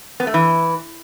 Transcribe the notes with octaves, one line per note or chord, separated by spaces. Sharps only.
B3
A3
E3